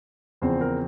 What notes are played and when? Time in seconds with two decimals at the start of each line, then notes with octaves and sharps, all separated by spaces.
0.42 E2 C#3 F3 C4 C5
0.61 A#4